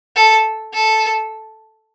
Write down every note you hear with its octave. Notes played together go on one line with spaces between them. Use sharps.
A4
A4